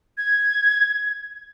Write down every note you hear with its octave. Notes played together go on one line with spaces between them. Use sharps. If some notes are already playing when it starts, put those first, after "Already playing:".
G#6